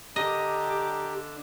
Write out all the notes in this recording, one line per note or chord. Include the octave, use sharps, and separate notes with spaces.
D3 D4 G4 D#5 A#5